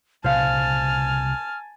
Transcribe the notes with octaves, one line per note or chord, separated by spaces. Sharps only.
C2 A#2 C#3 C5 F5 G#5 A5 F6